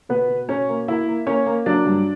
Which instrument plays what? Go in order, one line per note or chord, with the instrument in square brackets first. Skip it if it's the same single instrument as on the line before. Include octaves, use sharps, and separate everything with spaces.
[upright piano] B2 B3 B4
B2
B2 C#4 C#5
A#3
A#3 E4 E5
A#3
A#3 C#4 C#5
A#3
F#3 D4 D5
G2